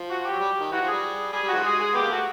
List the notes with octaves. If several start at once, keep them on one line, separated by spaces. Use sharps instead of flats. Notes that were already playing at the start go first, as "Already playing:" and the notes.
Already playing: F3
F#4
G4
F#3
G3
D#3
E3 F#4
F3
G#4
G3
G3 G#4
G3
F#4
D#3 F3 G#3
G#4
G#4
B3 G4
A#3
A3 F#4